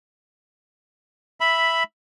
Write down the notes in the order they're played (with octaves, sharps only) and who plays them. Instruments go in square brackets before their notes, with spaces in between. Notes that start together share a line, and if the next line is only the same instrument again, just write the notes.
[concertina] E5 B5